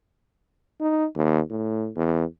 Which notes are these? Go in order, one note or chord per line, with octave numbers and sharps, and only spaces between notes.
D#4
D#2
A2
E2